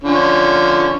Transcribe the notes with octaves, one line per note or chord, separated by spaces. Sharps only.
D3 F3 C#4